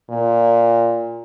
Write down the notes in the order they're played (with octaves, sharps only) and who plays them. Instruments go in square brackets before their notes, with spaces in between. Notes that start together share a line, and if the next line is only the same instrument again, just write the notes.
[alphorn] A#2